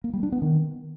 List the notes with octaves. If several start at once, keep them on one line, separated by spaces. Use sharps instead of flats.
A#3
G3
D4
B3
D#3